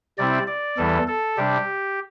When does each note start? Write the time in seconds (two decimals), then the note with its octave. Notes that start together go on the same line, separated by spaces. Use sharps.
0.18 C3 G3 C4 E4 D5
0.47 D5
0.78 E2 E3 G3 E4 A4
1.08 A4
1.37 C3 G3 D4 G4